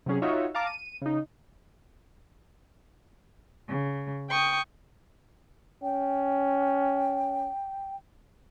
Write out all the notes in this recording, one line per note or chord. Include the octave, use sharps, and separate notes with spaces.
C3 F#3 C#4 G#4
D#4 F4 F#4 C#5 E5
F5 A5 A#5 D6
D#7
C#3 D#4
C#3
G5 C#6 D#6
C#4 G5